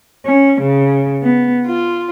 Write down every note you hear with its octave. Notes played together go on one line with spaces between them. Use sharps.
C#4
C#3
B3
F4